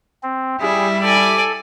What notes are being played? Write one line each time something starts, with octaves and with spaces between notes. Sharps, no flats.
C4
G3 E4 G#4
A4 D5 G#5